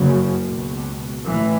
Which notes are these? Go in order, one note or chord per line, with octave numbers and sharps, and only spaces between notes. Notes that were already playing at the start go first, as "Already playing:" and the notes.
Already playing: F#1 F#2 C#3
C#2 B2
A1 A2 E3